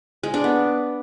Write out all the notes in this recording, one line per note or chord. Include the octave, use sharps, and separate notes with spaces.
G#3
D4
B3